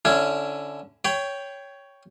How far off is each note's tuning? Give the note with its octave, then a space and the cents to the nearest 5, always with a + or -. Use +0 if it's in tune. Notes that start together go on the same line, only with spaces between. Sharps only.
D3 -10 C#4 +0 E4 +15
C#5 +10 G5 +0 B5 +45